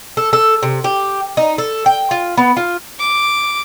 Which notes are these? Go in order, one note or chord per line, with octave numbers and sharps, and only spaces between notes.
A4
A4
C3
G4
D#4
A4
G5
F4
B3
F4
D6